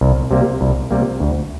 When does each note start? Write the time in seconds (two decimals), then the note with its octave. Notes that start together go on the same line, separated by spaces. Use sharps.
0.01 C2
0.31 C3 G3 A#3
0.61 C2
0.91 C3 G3 A#3
1.20 D2